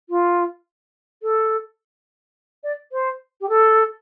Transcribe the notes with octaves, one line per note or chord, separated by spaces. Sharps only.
F4
A4
D5
C5
G4
A4